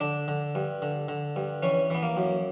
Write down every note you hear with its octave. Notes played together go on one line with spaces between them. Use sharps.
D3 D4
D3
G2
D3
D3
G2
E3 C#4
E3 B3
A#3
F#2